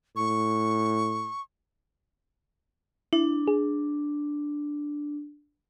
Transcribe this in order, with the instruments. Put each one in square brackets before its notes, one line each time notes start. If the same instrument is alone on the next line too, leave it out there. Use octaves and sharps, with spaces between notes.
[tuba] A2 [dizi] C#6
[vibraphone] D4 [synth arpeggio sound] E4
[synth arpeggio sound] G#4